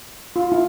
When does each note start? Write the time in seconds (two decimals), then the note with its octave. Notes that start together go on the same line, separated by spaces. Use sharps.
0.36 F4
0.52 E4